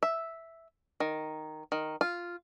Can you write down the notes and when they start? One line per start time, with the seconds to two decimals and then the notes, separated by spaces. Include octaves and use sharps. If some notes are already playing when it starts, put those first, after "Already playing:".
0.03 E5
1.00 D#3
1.72 D#3
2.01 F4